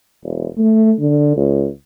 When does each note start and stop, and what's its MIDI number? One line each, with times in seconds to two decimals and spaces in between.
0.23 0.47 28
0.58 0.92 57
1.00 1.33 50
1.37 1.67 37